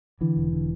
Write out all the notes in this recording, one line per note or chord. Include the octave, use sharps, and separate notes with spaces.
D3 E3
E1
D3